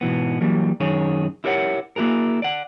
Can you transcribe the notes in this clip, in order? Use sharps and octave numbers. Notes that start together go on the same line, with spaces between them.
G#2 B2 E3 B3
E3 F#3 G3 A#3
F#2 D#3 G#4 C#5
E4 G4 A#4 C#5 D#5 F#5
A#3 E4 F#4 G#4 A#4
D5 F#5